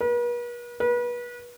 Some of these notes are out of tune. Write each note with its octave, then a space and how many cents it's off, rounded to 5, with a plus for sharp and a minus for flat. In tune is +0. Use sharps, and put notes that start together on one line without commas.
B4 -45
B4 -35